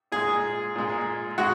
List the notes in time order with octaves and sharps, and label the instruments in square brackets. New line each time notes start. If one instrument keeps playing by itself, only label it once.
[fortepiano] A#2 G#3 G#4
A#2 G#3
G#3 F#4